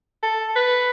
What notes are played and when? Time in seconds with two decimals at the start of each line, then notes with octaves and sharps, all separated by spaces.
0.23 A4
0.56 B4